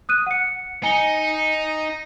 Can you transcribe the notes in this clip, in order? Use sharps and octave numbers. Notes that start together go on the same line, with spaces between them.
D#6 F#6 D#7
F#5 C#7
D#4 G#5 C#7 G7